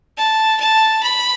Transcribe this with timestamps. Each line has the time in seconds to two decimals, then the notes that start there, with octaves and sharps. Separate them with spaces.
0.18 A5
0.60 A5
1.03 B5